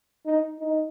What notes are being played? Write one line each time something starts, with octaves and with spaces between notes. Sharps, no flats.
D#4
D#4